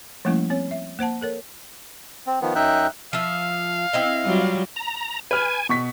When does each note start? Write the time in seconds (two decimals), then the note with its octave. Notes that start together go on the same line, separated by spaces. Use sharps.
0.25 F3 G3 A3 A#3 C#4 E4
0.50 C4 C#5
0.71 E5
0.99 A#3 C5 F#5 A5
1.21 A4 A#4 C#5
2.27 C4
2.42 D#3 F3 B3
2.55 F#2 D#4 E5 G5 F#6
3.13 F3 E5 F5
3.93 C4 E4 D#5
4.25 F#3 G3 F4
4.76 A#5
5.31 B4 G#5 F6
5.69 B2 C#6 B6